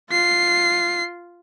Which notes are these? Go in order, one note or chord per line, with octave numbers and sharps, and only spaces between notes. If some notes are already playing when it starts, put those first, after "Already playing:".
F4 C7